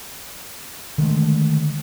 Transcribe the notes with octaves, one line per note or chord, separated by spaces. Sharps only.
D3 D#3 G#3 A3